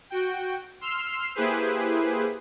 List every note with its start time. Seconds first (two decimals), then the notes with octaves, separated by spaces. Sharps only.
0.10 F#4 G5
0.81 C6 E6 F6 C7
1.35 A#3 E4 G4 G#4 B4 C5